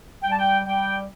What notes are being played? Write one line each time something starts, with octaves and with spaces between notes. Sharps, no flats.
G3 G5
A5
G5
G3 G5